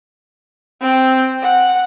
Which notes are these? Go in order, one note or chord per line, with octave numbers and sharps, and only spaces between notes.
C4
F#5